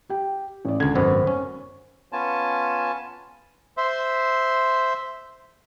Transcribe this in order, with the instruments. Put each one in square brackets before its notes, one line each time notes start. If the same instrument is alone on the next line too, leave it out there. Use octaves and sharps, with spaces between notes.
[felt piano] G4 G5
A1 D5
[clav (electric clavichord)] C#2 D3 [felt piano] G#6
[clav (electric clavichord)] G#1 F#2 B3 [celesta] C5
[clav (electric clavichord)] C#4
[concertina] B3 C#4 F4 G#5 A5
C5 E5 C6